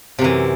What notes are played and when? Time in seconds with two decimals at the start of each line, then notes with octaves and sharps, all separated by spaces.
0.19 C3
0.21 F#2
0.24 E3